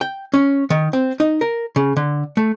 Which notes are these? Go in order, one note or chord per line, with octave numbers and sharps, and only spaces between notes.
G5
C#4
D#3
C4
D#4
A#4
C#3
D3
A3